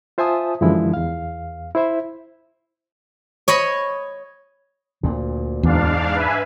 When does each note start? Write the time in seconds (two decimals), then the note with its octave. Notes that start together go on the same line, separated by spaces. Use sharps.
0.18 F4 C5 E5 G#5 A5 D#6
0.61 F#2 D3 E3 F3 G#3 E4
0.94 E2 F5
1.75 E4 C5 E5
3.48 C#5 D#5 B5
5.03 D2 A#2
5.63 E2 G#2 D4 F5
6.15 B4 E5 G#5